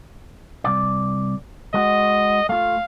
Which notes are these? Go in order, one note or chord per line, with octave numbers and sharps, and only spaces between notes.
C2 D5
G#3 F#4 D#5
A3 F4 F5